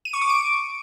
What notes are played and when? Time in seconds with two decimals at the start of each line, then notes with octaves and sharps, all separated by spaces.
0.05 D#7
0.13 C#6
0.21 D6
0.30 D7